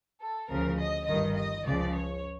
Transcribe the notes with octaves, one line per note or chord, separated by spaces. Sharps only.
A4
D2 C#3 F3 A#4
D#5
G1 G2 D#3 D#5
D#5
C#2 C#3 F3 D5
C#5